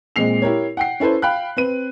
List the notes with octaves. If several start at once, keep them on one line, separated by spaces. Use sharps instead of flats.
A#2 G#3 C4 C7 F7
E4 G4 A#4 C#5
F#5 G5 C7
C#4 E4 A4 B4 C5
F5 G5 B5 F#6
C4 B4 D#7